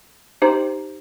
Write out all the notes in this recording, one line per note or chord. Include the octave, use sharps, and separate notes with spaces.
D#4 G4 C5